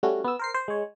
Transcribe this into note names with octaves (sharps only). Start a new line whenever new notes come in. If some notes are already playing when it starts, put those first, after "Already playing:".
G3 A3 C#4 F#4
B3 E6
A#4 C5 C7
C5
G#3 C#5